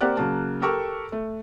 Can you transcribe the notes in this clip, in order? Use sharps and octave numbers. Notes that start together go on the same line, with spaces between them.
A#3 C4 G4 D5 F#5 F#6
C#3 F#3 A#3 A5
G4 A4 A#4 G5 C#6 E6
A3